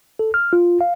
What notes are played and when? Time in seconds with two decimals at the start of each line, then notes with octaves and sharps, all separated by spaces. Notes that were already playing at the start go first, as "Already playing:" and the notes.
0.19 A4
0.34 F6
0.53 F4
0.81 F5